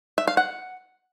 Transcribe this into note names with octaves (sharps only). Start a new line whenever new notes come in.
E5
F5
F#5